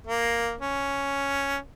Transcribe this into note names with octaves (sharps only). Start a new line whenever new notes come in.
A#3
C#4